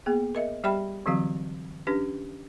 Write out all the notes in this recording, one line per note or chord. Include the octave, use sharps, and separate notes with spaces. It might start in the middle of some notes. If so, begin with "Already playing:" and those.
A#3 B3 G#4
A#4 D#5 E5
G3 G4 D5 E5 G5 B5
D3 E3 F#3 C4 F#4 F5
C#4 D4 G4 B4